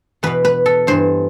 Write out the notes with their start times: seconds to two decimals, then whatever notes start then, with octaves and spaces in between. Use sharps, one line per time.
0.23 E2 B2 B4
0.45 B4
0.66 A4
0.87 G2 E3 C5